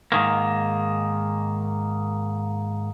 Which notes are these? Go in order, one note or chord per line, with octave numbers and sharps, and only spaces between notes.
G#2 D#3 A#3